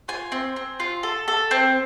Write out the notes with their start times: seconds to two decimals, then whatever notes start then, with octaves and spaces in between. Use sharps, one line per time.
0.08 F4 G#5
0.32 C4
0.56 C4
0.80 F4
1.03 A4
1.28 A4
1.51 C4